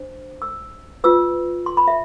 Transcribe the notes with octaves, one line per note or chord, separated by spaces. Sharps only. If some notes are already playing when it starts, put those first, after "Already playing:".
Already playing: D4 C5
E6
F4 B4 E6
C6
B5
E5